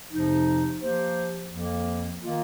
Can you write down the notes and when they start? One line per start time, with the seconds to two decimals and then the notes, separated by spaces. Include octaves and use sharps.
0.11 F2 C3 F3 D#4
0.81 F3 A#3 G4 C5
1.51 F2 F3 A#3
2.21 D#3 A#3 F4 D#5